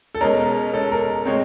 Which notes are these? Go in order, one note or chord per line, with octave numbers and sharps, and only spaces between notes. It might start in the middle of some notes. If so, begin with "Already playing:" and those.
A4
B2 G#3 C#4 A#4
B2 G#3 C#4 A4
A#4
B2 G#3 C4 C#5